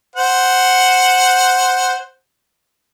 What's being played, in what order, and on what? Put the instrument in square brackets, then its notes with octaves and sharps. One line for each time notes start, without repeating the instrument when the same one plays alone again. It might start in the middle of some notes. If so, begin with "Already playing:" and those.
[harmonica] C5 F#5